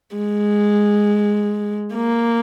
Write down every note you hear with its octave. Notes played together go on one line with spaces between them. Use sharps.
G#3
A#3